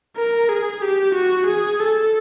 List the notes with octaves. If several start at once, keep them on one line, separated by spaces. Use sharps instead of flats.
A#4
G#4
G4
F#4
G#4
A4